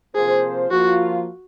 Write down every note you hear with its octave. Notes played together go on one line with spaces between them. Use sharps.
C3 F3 A#3 F4 G#4 C5
F3 A#3 F4 F#4